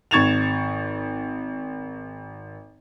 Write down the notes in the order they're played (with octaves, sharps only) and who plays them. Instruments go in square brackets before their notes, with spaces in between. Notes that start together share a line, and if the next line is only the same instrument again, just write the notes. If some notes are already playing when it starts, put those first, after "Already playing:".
[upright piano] G#1 C#6 G#6 A6 E7 F7